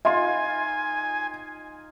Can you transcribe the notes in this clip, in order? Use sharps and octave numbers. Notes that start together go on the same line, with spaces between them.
D#4 F4 D#5 G#5 C6